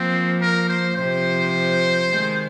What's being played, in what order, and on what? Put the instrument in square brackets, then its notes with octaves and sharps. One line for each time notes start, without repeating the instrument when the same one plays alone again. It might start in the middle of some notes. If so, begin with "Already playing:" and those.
Already playing: [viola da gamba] F3 A#3 [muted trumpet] C4
[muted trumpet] A#4
C5
[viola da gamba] C3 F3 [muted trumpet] C5
[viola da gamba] D#3 G#3